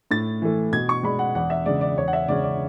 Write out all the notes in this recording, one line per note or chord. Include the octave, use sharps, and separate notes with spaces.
A2 A6
E3 A3
B2 G#6
C#6
G#3 D4 B5
F#5
E2 F#5
E5
C#3 G#3 D5
D5
E2 C#5
F#5
E5
C#3 G#3 C#4 D5
D5